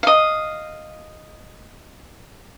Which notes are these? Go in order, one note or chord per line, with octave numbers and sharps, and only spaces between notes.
D#5 F5